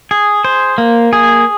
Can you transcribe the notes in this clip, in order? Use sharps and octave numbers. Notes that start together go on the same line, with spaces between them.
G#4
C5
A#3
G#4